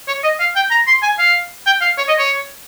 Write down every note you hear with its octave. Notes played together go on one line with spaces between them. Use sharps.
C#5
D#5
F5
G5
A#5
C6
G#5
F5
G5
F5
C#5
D#5
C#5